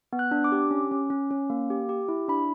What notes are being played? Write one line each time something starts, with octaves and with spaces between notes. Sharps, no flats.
B3
F#6
D4
D6
G4
C#4
C#4
C#4
C#4
A#3
G4
G4
E4
D4 B5